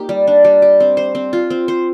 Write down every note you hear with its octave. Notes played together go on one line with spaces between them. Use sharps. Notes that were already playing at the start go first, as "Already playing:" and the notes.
Already playing: A#3 D#4 G4
G3
D4
G3
G4
C4
C5
C4
F4
C4
C5